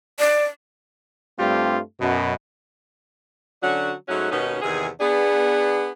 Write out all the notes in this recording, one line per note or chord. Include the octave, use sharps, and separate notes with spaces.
D5
G2 G3 A3 C4 F4 G4
F#2 B2
D3 F#3 C#4 D4 F#4
G#2 F#3 A3 C#4 D#4 F#4
D#2 B2 B3 C#4 D#4
E2 C3 D#3 G#4
B3 D4 G#4